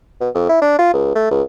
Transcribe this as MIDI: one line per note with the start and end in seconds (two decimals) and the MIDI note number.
0.21 0.29 47
0.35 0.47 41
0.49 0.61 64
0.62 0.76 62
0.79 0.91 65
0.93 1.15 37
1.15 1.28 57
1.31 1.42 37